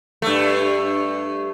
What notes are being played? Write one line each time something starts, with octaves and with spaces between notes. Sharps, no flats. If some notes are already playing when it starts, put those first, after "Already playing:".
G2 A3